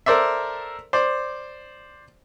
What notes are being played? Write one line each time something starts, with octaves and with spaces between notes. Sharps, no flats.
A4 A#4 C5 D5 E5
C5 D5